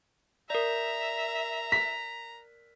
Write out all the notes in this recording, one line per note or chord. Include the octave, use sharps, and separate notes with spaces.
A#4 D5 E5 A#5
B6